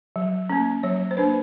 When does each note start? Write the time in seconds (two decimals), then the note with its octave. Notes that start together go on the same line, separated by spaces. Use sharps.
0.16 F#3
0.50 A#3 C#4
0.83 F#3 C#5
1.11 C5
1.17 A#3 D4 B4